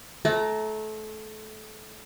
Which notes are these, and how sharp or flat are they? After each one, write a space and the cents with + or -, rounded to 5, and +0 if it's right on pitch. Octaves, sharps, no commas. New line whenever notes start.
A3 -25 A#5 +0